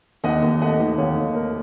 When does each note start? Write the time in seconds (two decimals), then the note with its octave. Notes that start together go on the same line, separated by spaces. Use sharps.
0.24 D#2 D#5 F#5
0.42 D#2
0.61 A3 D#5 F#5
0.80 D#3
0.98 D#2 C#5 F5
1.16 D#2
1.35 A3 A#4